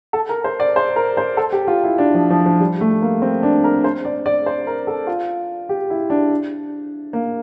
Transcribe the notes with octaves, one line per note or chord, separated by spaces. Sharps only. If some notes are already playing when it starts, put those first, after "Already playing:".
A4
A#4
C5
D5
C5
A#4
C5
A4
G4
F4
E4
D4
F3
F3
F3
G3
A3
A#3
C4
D4
A#4
C5
D5
D5
C5
A#4
A4
F4
G4
E4
D4
A#3